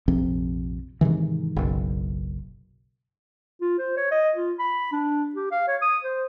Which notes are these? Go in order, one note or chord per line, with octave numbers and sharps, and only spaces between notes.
A#1 F2 C3
G#2 C3 D#3 E3
F#1 B1
F4
C5
C#5
D#5
F4
B5
D4
G4
F5
C#5
D#6
C5